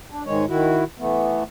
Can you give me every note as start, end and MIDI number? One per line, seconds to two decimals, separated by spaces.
0.11 0.23 62
0.26 0.45 44
0.26 0.45 51
0.26 0.45 56
0.26 0.45 73
0.48 0.84 51
0.48 0.84 64
0.48 0.84 66
0.99 1.43 52
0.99 1.43 57
0.99 1.43 59